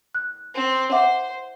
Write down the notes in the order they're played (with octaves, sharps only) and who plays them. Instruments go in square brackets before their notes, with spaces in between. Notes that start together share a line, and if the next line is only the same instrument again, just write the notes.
[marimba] F#6
[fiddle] C4
[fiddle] C5 [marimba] E5 F#5 D6